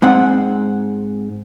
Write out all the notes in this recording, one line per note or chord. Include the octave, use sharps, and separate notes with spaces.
G#2 C4 F#5